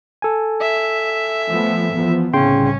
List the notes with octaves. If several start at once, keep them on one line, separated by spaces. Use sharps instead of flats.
A4 G#5
E5
F3 A3 B3
E2 F3 B3
C2 A2 C#3 C#4 G5 C6